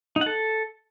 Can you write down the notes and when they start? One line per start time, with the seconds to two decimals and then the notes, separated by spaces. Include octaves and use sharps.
0.16 D#4
0.21 F#5
0.26 A4